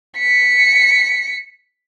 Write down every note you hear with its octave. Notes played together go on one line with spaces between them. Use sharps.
B6 C#7